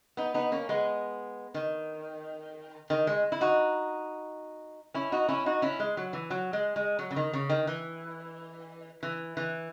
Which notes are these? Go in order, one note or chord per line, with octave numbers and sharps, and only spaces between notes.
B3 D#4
B3 D#4
A#3 C#4
G#3 B3
D#3
D#3
G#3
E4
D#4 F#4
C#4 E4
D#4 F#4
C#4 E4
D#4 F#4
C#4 E4
G#3
F#3
E3
F#3
G#3
G#3
F#3
C#3
D#3
C#3
D#3
E3
E3
E3